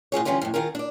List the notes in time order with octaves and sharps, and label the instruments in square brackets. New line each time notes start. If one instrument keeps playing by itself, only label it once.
[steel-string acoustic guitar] A2 F4 G#4 C#5
D3 E3 G3 C#4 F4
F2 A2
D#3 F4 G#4 A#4
D4 D5